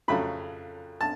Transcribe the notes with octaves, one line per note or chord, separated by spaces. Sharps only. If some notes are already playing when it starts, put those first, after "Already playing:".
F2 C#3 F#3 A3 B5
A5